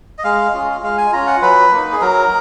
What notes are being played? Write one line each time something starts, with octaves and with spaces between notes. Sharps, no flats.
D#5
G#3 F5
C#4 F4
G#3 F5
G#5
C#4 F4 A#5
F#5
F#3 B4
A#3 D#4
G#4
F#3 A#4